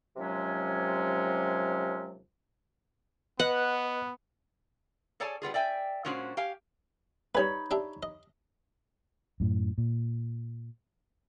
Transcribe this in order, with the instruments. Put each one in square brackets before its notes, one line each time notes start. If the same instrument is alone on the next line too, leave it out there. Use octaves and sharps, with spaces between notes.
[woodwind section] D#2 C3 F3 F#3 G#3 C#4
[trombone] B3 [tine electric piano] B4 D#5 [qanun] F#5
[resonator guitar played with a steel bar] G#4 A4 C#5 D5 G#5 A5
G3 B3 F4 G#4
D5 E5 G5 G#5
A#2 G#3 C#4 D4 F#4 C5
G4 F5 G#5
[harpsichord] G3 B4 [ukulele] D#4 C#5 B5
[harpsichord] D4 G4 E5
D#5
[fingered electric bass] F#2 A2
A#2